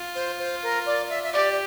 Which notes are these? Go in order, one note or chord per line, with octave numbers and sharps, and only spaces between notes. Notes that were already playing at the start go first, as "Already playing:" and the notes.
Already playing: F4
C5
C5
A#4
D5
E5
E5
G4 D5